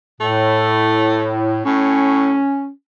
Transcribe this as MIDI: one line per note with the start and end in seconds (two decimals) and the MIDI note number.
0.21 1.61 45
0.21 1.37 57
1.65 2.42 45
1.65 2.70 61